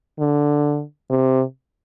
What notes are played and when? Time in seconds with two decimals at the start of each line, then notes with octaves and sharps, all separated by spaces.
0.19 D3
1.10 C3